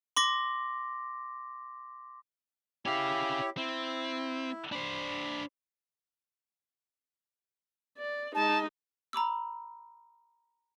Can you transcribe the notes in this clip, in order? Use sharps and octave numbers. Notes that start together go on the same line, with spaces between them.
C6 D6 A#6
C#4 E4 G4 F5
C4 E4
D4 C5 B5
D5
G#3 D#4 A5
A#5 B5 D6 E6